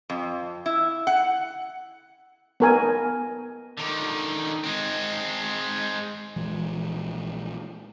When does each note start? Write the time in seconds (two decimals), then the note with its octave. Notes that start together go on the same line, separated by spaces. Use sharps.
0.10 F2
0.66 E4
1.07 F#5
2.60 B3 A#4 G#5
3.77 D3 D#3
4.64 G#3 C4
6.36 A#1 E3 G#3